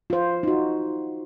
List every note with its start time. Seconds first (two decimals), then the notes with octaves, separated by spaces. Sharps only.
0.10 F4 C5
0.43 D#4 F#4